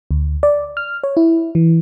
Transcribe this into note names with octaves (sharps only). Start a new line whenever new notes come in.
D2
D5
F6
C#5
E4
E3